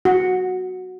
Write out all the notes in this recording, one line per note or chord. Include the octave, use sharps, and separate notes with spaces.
F#4